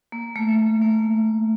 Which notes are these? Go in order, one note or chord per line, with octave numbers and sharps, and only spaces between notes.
A#3
A3
A3
A#3